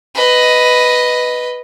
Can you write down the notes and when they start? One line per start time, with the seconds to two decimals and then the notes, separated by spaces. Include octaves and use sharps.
0.15 B4 D#5